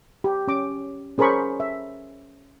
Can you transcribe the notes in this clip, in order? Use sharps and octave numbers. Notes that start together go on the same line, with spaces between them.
G4
C#4 D6
C#4 G#4 A#4 C5 B5 C#6
E5